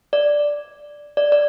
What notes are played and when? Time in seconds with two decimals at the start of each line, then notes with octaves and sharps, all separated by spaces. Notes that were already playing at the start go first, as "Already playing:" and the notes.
0.13 D5
1.17 D5
1.32 D5